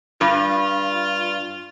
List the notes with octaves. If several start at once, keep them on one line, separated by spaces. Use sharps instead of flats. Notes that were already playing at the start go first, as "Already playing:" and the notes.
G2 F4